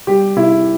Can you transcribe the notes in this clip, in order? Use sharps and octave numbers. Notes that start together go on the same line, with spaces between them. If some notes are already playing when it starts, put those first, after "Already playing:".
G3 G4
C3 E4